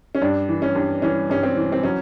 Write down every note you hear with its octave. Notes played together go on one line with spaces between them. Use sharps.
C#4
G2 D4
E3
C#4
G2
E3 C#4
G2 C#4
C4
E3
C4
F#3 C#4